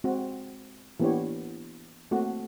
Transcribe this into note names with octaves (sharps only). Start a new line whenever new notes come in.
G#3 C4 F#4
E3 A#3 B3 D4 G4 C#5
A3 A#3 C4 F#4